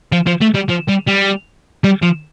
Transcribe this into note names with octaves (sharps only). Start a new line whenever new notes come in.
F3
F3
A3
G3
F3
G3
G3
G3
F3